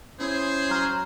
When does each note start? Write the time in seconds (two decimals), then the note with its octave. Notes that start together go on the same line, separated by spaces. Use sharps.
0.20 C#4 E4 G#4 C5
0.70 F#3 A#5 F6